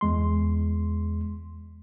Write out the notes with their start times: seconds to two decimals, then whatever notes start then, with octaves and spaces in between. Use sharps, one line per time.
0.01 E2 G#3 C6